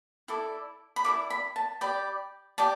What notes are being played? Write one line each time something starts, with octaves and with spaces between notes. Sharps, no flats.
E4 A4 D5
B5
E4 A4 D5 D6
B5
A5
G4 D5 B5
G4 D5 A5